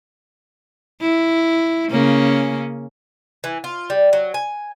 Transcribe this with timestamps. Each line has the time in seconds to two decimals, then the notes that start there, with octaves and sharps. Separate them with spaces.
1.01 E4
1.91 C#3 A#3 C#4
3.44 E3
3.64 F4
3.90 G3
4.13 F#3
4.34 G#5